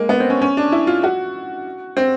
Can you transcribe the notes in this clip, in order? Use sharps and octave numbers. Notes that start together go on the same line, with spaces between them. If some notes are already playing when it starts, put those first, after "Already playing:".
Already playing: G#3 A#3
B3
C4
C#4
C#4
D4
E4
F4
F#4
C4